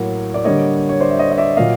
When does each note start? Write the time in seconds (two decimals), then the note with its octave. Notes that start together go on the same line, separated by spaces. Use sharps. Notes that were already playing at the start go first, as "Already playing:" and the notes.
Already playing: A2 F#3 A#3
0.34 D5
0.44 D3 G3 A#3 C#5 D#5
0.89 C#5
1.01 C5 D5
1.10 E5
1.19 C#5 D#5
1.32 D#5
1.38 D5 E5
1.57 A#2 F#3 A#3 D#5 F5